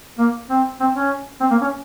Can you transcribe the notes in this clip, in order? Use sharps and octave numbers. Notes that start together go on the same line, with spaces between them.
A#3
C4
C4
C#4
C4
A#3
C#4